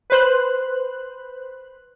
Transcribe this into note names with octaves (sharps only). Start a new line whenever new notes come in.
B4 C5 F#6